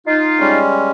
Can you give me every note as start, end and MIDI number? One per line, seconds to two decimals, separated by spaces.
0.06 0.59 63
0.06 0.59 65
0.40 0.91 55
0.40 0.91 56
0.40 0.91 61